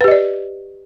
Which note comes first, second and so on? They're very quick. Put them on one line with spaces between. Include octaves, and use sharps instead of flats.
B4 G4 D#5 D5